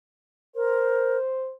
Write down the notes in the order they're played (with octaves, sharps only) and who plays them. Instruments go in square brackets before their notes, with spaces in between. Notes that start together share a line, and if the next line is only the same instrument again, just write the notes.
[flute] A#4 [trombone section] C5